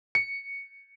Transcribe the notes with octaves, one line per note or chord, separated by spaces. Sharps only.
C#7